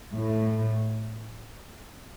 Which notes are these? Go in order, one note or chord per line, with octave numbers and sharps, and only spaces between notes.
A2